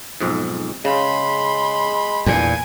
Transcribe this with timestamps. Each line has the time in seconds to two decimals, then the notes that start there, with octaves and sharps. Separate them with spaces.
0.20 B1 F2 G#2
0.85 C#3 G#3 B5 C6
2.26 E2 A#2 D3 D4 G#5